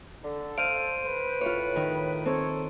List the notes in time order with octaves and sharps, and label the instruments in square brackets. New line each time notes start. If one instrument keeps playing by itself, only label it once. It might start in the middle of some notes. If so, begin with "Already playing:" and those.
[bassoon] D3 [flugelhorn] A4
[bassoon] C5 [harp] F5 [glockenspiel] D7 D#7
[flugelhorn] B4
[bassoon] A2 [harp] F4 C#5
[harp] D#3
[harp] C4 [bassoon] A4 [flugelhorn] C#5